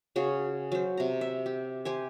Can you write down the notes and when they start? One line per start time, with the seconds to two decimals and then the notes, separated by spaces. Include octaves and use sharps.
0.16 C#3 F#4 G#4 C#5
0.72 F#3 C5
0.97 C3 A#5
1.21 E5
1.46 G4
1.85 G4 C5 G#5